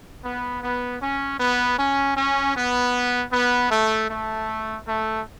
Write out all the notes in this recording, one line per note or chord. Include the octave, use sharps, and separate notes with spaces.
B3
B3
C#4
B3
C#4
C#4
B3
B3
A3
A3
A3